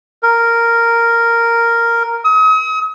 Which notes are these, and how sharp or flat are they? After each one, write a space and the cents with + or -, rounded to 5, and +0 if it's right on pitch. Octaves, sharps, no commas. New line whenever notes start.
A#4 -5
D#6 +40